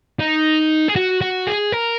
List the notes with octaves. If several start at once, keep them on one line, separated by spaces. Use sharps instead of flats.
D#4
G#4
F#4
F#4
G#4
A#4